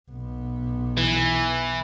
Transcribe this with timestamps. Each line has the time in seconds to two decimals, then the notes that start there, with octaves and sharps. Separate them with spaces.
0.11 B1 B3
0.98 E3